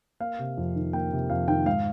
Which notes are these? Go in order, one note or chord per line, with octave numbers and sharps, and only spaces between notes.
A#3 F5
C3
F2
D#3
A#3 G5
C3
F2 F5
D#3 G5
G#2 F5